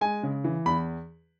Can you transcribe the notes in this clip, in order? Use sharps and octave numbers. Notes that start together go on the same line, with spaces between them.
G#3 G#5
C#3
E3
E2 B5